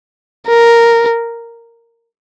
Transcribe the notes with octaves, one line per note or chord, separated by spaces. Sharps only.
A#4